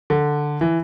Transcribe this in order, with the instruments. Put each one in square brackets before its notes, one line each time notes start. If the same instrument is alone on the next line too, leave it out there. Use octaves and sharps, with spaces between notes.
[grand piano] D3
E3